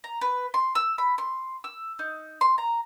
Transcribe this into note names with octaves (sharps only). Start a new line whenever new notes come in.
A#5
B4
C6
E6
B5
C6
E6
D#4
C6
A#5